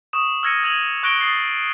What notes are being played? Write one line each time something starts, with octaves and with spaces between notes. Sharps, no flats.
C#6 D#6 E7
E6 F6 G#6 A#6 C#7 D#7
E6 G#6 D#7 F7 F#7
C#6 F#6 A#6 D7 G7
D#6 A6 C7 F#7